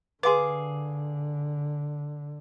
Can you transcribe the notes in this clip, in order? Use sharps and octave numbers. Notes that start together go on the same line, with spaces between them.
D3 G#4 B4 F5 C6 D6